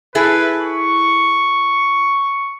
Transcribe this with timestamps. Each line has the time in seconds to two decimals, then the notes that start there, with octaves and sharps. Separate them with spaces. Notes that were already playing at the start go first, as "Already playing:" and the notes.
0.15 E4 G#4 A4 B4
0.61 C#6